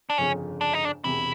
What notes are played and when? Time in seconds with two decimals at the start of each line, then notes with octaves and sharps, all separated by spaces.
0.10 D4
0.18 G1 F2 C#3 C#4
0.61 D4
0.74 D#4
0.85 D4
1.04 E1 E2 C3 E4